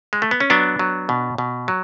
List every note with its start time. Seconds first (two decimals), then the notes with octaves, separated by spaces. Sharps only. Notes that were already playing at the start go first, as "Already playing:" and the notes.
0.13 G#3
0.22 A3
0.31 B3
0.40 C#4
0.50 F#3 B3 D4
0.79 F#3
1.09 B2
1.38 B2
1.68 F#3